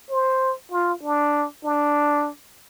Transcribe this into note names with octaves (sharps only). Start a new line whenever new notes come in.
C5
F4
D4
D4